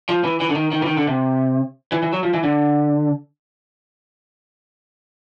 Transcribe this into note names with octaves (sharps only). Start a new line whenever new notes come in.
F3
E3
E3
D3
D#3
D#3
E3
D#3
D3
C3
E3
E3
F#3
F3
E3
D3